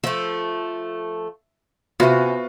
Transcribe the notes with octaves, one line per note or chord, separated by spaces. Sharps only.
F3 A3 E5
C3 B3 C#4 F4 F#4 C5 E5